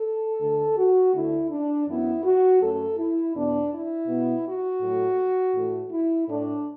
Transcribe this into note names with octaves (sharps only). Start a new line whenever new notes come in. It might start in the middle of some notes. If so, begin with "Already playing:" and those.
Already playing: A4
D2 D3 A3
F#4
D2 D3 A3 E4
D4
F#2 E3 B3 E4
F#4
F#2 F#3 A3 A4
E4
E2 B2 B3 D4
E4
B2 B3
F#4
A2 F#3 A3
A2 E3 A3
E4
A2 A3 D4